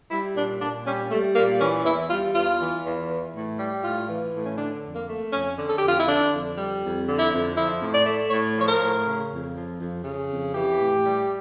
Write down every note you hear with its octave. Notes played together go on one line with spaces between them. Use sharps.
G3 E4
A#2 D4
A#2 D4
G3 C#4
G3 A3
A#2 A#3
E3 C#4
E2 E4
G3 F4
E2 F4
E3
E2
E3
A2
G3
A2 F4
E3
A2
C#4
D3 D4
F2
A#3
A3
F2 C#4
D3
A4
F2 G4
F4
E4
D3 D4
F2
G3
F2
D3
E4
F2
F3 E4
A2
D5
A3
A2 C#5
F3
C#5
A#4
A2
C#3
F2
F3
F2
C#3
F2
E3 G4
A2
G3